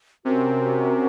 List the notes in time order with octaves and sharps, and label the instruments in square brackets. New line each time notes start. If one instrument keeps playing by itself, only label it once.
[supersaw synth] C3 [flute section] C#4 F#4 A#4